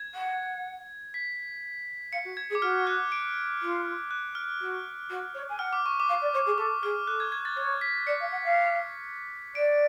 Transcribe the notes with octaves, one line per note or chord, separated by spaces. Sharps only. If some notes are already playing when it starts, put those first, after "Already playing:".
Already playing: G#6
F#5
B6
F5 C#7
F#4
G#6
G#4
D6
F#4 F6
F#6
D7
F4
F#6
F6
F#4
F#4
C#5
G#5
F#5 F6
D6
C#6
D6
F5
D5
C#5
G#4
A4 D6
G#4 F6
A4 F#6
G#6
G#6
A6
C#5 A6
B6
D5 C#7
F5
F#5
F5
D5 D7